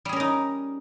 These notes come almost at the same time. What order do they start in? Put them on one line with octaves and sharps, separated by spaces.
G3 G#4 C#4 A#4 D#4